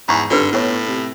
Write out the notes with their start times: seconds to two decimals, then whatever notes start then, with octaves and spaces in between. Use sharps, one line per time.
0.09 E2 G#2 G#5 A#5 C#6
0.31 G#1 G2 D3 F4 B4 F6
0.52 A2 B3 C#5
0.87 C3